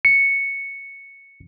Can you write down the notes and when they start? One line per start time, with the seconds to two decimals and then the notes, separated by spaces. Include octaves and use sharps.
0.05 C#7